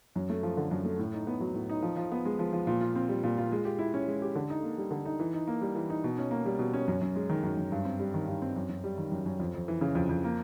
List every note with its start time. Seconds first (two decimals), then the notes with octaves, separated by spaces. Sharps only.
0.16 F#2
0.30 A3
0.43 F3
0.57 D3
0.71 F#2
0.85 A3
0.99 A2
1.13 D#4
1.27 B3
1.41 F#3
1.54 A2
1.69 D#4
1.82 F3
1.97 F3
2.12 B3
2.25 G#3
2.39 F3
2.53 F3
2.67 A#2
2.81 F4
2.96 C4
3.09 G3
3.23 A#2
3.38 F4
3.52 G#3
3.65 G4
3.79 E4
3.94 C#4
4.08 G#3
4.22 G4
4.35 D3
4.50 D#4
4.63 A#3
4.78 G3
4.91 D3
5.05 D#4
5.20 E3
5.33 D#4
5.47 A#3
5.61 G3
5.76 E3
5.90 D#4
6.04 B2
6.18 C#4
6.31 A#3
6.46 G3
6.59 B2
6.74 C#4
6.88 F#2
7.01 F#2
7.16 G#3
7.29 D#3
7.43 F#2
7.57 F#2
7.72 G2
7.85 C4
8.00 G3
8.14 D#3
8.28 G2
8.42 C4
8.56 F#2
8.69 F#2
8.84 G3
8.98 D#3
9.12 F#2
9.26 F#2
9.40 F2
9.54 F2
9.68 E3
9.81 C#3
9.95 F2
10.09 F2
10.24 A#3